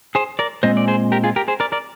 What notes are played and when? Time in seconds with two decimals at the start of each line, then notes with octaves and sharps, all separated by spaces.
0.15 G#4 C5
0.39 A#4 D5
0.63 A#2 G#3 C4 C5 D#5
0.77 D5
0.88 G#4 C5
1.12 G4 A#4
1.24 F4 G#4
1.36 G4 A#4
1.48 G#4 C5
1.60 A#4 D5
1.72 A#4 D5